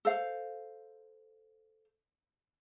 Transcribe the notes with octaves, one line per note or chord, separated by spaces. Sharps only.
A4 C5 F5